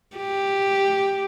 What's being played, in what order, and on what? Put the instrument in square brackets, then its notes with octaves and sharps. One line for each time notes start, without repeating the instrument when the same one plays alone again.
[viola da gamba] G4